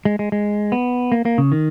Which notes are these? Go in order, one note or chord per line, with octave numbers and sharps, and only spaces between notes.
G#3
G#3
G#3
B3
A#3
A#3
C#3
D#3